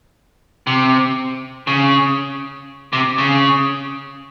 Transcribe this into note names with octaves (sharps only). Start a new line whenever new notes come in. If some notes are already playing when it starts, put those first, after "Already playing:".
C3
C#3
C3
C#3